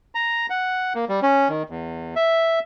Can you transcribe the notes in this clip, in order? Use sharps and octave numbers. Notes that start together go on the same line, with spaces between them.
A#5
F#5
A#3
G3
C#4
D#3
E2
E5